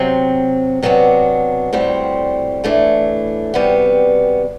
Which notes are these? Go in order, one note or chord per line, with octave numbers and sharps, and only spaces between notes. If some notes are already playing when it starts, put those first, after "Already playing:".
Already playing: C3 F#3 C4
C3 F#3 B3 D4 F#4
A2 G3 C4 F#4
A2 E3 A3 D4
C3 G3 B3 F#4